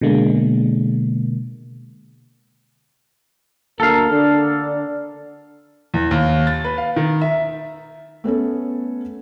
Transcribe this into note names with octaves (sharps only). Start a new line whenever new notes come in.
B2 D3 G#3 A#3
D2 A#3 A4 A#4 F5
D3 D4
E2
D#2
A6
B4
F5
D#3
E5
A3 B3 C#4 A4